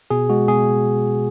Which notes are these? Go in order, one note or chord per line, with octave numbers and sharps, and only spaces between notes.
B2 G#4
G#3 F#4
B2 G#4